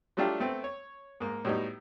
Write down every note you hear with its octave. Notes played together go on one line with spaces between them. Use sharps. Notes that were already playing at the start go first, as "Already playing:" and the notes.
F#3 G3 A3 D4 F4 G4
A3 B3 C4
C#5
G#2 A#3
A2 F#3 G3 B3 D#4